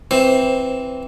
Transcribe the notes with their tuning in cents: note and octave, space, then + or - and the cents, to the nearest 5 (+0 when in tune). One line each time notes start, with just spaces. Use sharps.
E3 +0 C4 +0 C5 +15